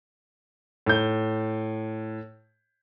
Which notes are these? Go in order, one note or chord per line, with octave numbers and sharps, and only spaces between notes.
A2 G6